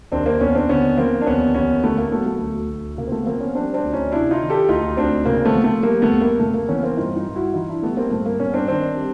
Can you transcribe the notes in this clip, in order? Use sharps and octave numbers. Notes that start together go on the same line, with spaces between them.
D#2 C4 D4
A#3 C4
D#2 B3 C#4
C4 D4
D3 B3 C#4
F3 A#3 C4
D4
D#2 B3 C#4
D#2 B3 C#4
D3 A3 B3
A#3
F#3 A3 B3
A3
D2
D2
C#3 A#3
C4
A3 B3
F3 A#3 C4
B3 C#4
G3 C4 D4
C4 D4
D2
C#4 D#4
C3 D4 E4
D#4 F4
D#3
G4 A4
D2 D#4 F4
D2 C4 D4
C#3 A#3 C4
A3 B3
F3
A3
G3 A#3
A3 B3
F2
A#3
C#3 A3
A#3
E3 B3 C#4
A#3 C4
G2 D#4 F4
D#4 F4
G2
E4 F#4
E3 D#4 F4
D4 E4
G3 A3 B3
A#3 C4
G2 A3
A#3
G2 B3 C#4
C4 D4
D#3 C4 D4
G3